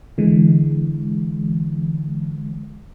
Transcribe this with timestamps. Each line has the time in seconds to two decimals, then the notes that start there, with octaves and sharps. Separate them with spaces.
0.18 D3 E3 G#3